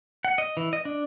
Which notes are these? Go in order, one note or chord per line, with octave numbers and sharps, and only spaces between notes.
F#5
D#5
E3
D#5
D4